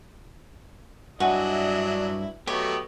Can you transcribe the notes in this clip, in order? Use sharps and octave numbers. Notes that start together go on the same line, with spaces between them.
G2 F#3 D4 E4 F#4 D#5 E5 G#5
F#3 A3 B3 G4 A4 C#5 D#5